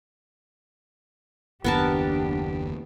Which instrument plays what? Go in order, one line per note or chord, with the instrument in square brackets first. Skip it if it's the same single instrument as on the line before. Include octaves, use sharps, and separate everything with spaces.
[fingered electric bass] F#1 D#2 [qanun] B3 A#4 A5 [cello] D4 G4